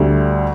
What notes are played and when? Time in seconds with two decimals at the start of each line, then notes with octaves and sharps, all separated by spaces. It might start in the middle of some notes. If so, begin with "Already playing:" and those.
Already playing: D2 D3 G3